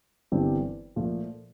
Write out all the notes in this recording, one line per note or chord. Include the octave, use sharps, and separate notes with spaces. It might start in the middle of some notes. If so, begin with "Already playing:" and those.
G1 G2 E3 G3 C4
A#2 F3 A3